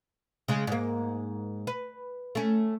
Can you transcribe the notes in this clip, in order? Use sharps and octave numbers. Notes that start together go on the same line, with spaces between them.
C#3 G#3
G#2 A#3
B4
A3 C#4